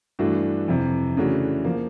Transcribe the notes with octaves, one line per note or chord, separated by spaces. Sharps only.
G2 E3 A3 D4 F#4
F2 C3 E3
C#3 E3 A3 D4 F#4
F3 A#3